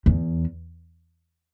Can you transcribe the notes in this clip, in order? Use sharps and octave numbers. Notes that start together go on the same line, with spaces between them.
E2